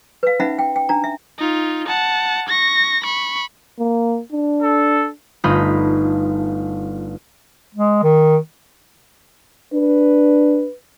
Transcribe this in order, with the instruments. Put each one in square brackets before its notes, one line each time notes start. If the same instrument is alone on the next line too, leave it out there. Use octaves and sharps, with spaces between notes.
[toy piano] B4 F5
C#4 D#4 E5 F#5 B5
G5
G5
D4 A#5
E5
[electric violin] D#4 F4
F#5 A5
C#6 A#6
B5 C#6
[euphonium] A#3
D4
[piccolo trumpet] A4
[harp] G1 A3 D#4 F4 B5 D#6
[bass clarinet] G#3
D#3
[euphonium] D4 [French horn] B4